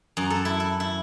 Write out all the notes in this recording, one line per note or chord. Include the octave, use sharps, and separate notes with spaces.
F#2
A4
E4
E4
E4